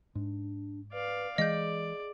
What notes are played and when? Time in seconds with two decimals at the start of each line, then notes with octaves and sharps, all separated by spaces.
0.15 G#2 D4
0.93 B4 D5 F5
1.38 E3 G#3 G#4 D5 D#5 G6